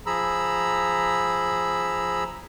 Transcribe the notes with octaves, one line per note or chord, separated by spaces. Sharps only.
F3 G#4 A#5 B5 E6